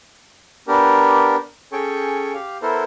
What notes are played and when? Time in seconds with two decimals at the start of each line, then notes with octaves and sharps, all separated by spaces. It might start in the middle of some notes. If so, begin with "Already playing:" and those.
0.68 B3 D4 G4 A#4
1.73 C#4 G#4 A4 G5 C#6
2.34 G4 F5
2.62 B3 E4 A4 A#4 C5